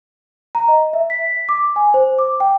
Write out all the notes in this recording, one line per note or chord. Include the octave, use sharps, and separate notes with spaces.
A#5
D#5
E5
B6
D6
G#5
C5
D6
G5